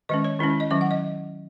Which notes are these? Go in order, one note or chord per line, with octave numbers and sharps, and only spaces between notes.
D#3 G#3 C#4 D#5
C#5
D#3 G#3 C#4 E4
E4
D#5
D#3 F#3 C#4 E5
F#5
D#5